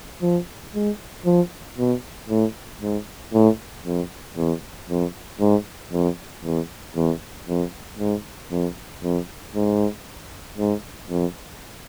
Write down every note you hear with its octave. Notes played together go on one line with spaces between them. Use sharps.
F3
G#3
F3
B2
A2
G#2
A2
F2
E2
F2
G#2
F2
E2
E2
F2
G#2
F2
F2
G#2
G#2
F2